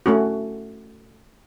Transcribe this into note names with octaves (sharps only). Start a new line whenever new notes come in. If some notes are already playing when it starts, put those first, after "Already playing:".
A3 C#4 F#4